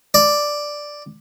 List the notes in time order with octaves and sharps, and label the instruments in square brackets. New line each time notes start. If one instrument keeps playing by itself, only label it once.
[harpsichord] D5